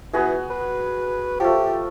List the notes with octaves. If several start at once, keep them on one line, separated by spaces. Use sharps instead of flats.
E3 B3 F#4 G#4
B4
F3 A3 G4